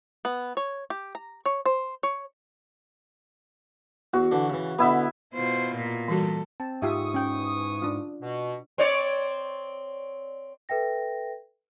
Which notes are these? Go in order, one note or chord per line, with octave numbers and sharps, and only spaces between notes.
B3
C#5
G4
A#5
C#5
C5
C#5
E2 F#4
D3 E3 D4
C#3 E3
B2 D3 B3 E4 E5
B2 E4 F4 C5
A#2
E3 G3 F#4 A4
C4 A5
G#2 E3 F4 G4 E5 C#6 D#6
C#4 G5
D4 F4
B2
C4 C#5 D5
A4 B4 E5 G5 A#6